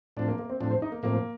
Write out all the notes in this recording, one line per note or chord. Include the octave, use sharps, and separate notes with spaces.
A2 F3 C4 D4
A#3
A#3
C4
A2 F3 C4 D4
C5
D#4
A#3
A2 F3 A#3 C4